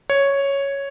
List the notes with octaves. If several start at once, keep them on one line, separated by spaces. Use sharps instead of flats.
C#5